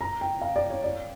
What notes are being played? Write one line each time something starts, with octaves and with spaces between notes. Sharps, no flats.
A#5
G5
F5
D5
C#5
D5